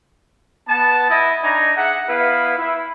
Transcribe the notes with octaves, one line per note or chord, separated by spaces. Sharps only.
B3 A5
E4 D#5
D4 D#4 G#5 A#5
G#4 E5 F#5
B3 E4 B4 F5
E4